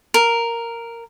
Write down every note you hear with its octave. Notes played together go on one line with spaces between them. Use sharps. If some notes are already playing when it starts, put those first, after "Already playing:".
A#4